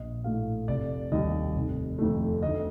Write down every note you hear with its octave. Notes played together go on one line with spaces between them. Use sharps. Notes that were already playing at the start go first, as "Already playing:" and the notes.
Already playing: A#1 D#5
A2 A3 F5
F1 D5
D#2 D#3 G3 D#5
F1
F2 D#3 A3
D2 D#5